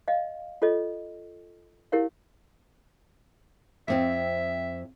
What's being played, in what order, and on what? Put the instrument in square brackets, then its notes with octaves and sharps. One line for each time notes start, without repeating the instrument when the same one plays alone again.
[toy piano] D#5 F5
F4 A4 C#5 D#5
E4 G4 A#4 C#5 F5
[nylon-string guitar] F2 C4 F4 [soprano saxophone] E5